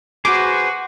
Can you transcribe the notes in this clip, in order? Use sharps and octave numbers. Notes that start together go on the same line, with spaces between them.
F#4 G#4 B4 C5 D6